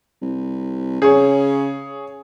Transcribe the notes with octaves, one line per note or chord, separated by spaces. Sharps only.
C2
C#3 G#4 C#5